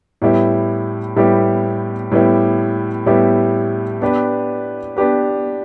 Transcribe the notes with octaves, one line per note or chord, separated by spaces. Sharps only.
A2 G3 B3 E4 G4
A2 G3 B3 E4 G4
A2 G3 B3 E4 G4
A2 G3 B3 E4 G4
B3 D4 G4 B4
B3 D4 G4 B4